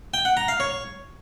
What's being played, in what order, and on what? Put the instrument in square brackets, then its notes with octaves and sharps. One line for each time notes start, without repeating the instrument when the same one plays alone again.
[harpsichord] G5
F#5
A#5
F5
C#5